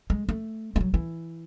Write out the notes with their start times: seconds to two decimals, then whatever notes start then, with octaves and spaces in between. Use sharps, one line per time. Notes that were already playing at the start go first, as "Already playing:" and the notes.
0.10 G#3
0.29 A3
0.76 G#3
0.81 F#3
0.94 E3